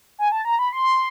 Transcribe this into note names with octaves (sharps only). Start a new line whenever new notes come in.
G#5
A5
A#5
B5
C6